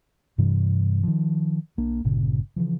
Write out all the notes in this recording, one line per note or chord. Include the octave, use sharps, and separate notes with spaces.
G2 C3 E3 G3
D#3 F3
B1 A#3 D4
G1 A#2 C#3
C#3 E3 F3